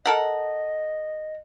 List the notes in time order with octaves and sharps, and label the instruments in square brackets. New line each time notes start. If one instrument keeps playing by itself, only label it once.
[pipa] A4 A#4 F#5 [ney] D#5